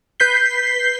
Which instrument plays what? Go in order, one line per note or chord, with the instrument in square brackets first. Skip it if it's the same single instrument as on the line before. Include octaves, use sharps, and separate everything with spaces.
[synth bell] B4 G6 B6 C7 G7